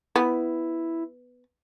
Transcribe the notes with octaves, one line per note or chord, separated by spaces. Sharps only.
B3 E4